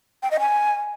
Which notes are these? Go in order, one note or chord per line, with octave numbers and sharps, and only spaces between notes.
G5
D#5
G#5